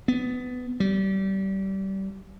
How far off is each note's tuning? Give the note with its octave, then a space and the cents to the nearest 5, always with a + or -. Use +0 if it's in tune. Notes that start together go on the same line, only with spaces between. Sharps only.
B3 +20
G3 -25